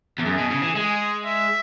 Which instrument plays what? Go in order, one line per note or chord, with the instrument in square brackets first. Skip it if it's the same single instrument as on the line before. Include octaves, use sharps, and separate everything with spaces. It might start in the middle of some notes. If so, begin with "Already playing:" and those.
[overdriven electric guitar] E2
[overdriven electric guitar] F#2 [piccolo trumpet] G#4
[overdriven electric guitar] B2
C#3
E3
[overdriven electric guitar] G#3 [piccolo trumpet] G#4
[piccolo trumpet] E5